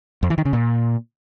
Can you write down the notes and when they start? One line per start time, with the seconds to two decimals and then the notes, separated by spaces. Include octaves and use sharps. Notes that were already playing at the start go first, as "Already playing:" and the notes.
0.23 F2
0.30 E3
0.38 D#3
0.45 C#3
0.53 A#2